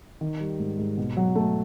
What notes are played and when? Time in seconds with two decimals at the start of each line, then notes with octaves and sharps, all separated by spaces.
0.21 D#3
0.40 G3
0.59 G#2
0.79 G#2
0.97 B2
1.17 F#3
1.36 A3